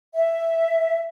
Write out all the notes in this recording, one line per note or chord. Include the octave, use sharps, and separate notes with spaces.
E5